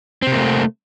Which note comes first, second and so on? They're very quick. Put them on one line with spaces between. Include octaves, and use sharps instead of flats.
C4 C3 A#3 A3